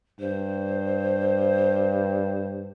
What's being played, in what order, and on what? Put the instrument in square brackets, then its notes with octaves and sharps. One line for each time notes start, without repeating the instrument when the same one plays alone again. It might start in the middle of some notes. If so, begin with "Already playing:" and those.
[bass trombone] G2 [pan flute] C5